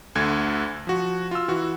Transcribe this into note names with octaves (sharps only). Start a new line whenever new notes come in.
D2 D3 A4 G#6
F3 F#4
F4 E6
E3 F#4